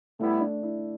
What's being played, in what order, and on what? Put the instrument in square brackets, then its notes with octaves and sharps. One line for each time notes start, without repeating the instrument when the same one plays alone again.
[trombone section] A2 G3 B3 E4 [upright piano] A3
[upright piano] D4
E4